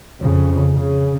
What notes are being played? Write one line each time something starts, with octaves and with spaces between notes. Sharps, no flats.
F2 C#3
C#3